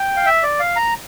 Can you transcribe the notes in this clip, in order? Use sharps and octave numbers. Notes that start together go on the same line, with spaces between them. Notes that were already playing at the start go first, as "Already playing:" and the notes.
Already playing: G5
F5
E5
D5
F5
A#5